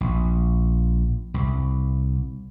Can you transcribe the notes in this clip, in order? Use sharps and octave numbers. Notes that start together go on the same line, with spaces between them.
A#1
C2